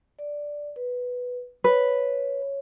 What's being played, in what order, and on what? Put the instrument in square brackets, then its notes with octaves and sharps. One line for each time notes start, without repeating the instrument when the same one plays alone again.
[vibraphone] D5
B4
[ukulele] B4 [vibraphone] C#5